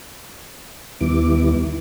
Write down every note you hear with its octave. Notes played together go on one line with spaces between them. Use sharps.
D#2 D#3 G3 B3 E4 D6